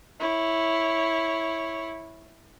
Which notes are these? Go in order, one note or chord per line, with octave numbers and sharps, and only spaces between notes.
E4 C#5